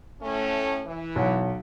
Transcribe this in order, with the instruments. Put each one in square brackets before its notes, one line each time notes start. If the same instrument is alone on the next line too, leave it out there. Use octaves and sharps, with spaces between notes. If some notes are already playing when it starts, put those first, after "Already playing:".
[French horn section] A2 A3 C#4
E3
[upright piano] B1 F#5